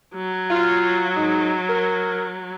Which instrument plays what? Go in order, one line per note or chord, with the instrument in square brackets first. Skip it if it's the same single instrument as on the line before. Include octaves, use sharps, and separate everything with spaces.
[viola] F#3
[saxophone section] F4
G#2 D#4
A#4